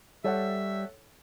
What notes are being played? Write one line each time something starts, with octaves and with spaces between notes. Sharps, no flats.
G3 A4 C#5 E5 F#5